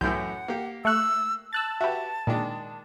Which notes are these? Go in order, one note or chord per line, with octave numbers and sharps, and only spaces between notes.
C2 F#2 A2 E3 F#5 G6
A#3 G4
A3 C#6 E6 F#6
A5 E6 F#6 A6
F#4 G4 B4 E5
A#2 D#3 G#3 D4